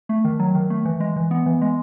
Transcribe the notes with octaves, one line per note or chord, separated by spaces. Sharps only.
A3
D#3
F#3
D#3
A3
E3
G#3
E3
B3
E3
G#3